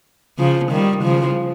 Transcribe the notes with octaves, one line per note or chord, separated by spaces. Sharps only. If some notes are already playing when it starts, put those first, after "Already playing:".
C#3 F3
D#3 G3
C#3 F3